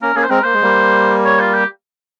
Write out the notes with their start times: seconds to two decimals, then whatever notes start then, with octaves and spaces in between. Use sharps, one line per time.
0.02 A#3 C#4 A#4
0.16 A#3 C#4 G#4
0.23 C5
0.30 G#3 C4 A#4
0.43 A#3 C5
0.54 G#3
0.62 G3 A#3
1.25 C#5
1.40 F4
1.53 G4